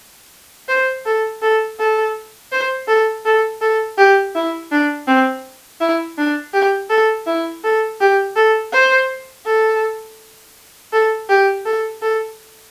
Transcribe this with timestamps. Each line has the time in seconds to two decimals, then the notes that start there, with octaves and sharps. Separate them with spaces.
0.68 C5
1.06 A4
1.42 A4
1.79 A4
2.52 C5
2.88 A4
3.25 A4
3.61 A4
3.98 G4
4.35 E4
4.71 D4
5.07 C4
5.80 E4
6.18 D4
6.53 G4
6.90 A4
7.27 E4
7.64 A4
8.00 G4
8.36 A4
8.72 C5
9.46 A4
10.93 A4
11.29 G4
11.65 A4
12.02 A4